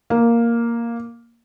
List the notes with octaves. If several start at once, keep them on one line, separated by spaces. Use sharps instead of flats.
A#3